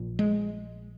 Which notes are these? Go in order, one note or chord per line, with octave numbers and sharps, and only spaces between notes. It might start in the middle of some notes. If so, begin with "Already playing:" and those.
Already playing: A#1 A#2
G#3